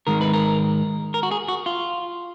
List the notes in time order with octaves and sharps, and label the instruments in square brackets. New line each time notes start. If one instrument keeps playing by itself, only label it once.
[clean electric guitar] G#2 D#3 G#3 A#4
B4
A#4
A#4
F#4
G#4
F#4
F4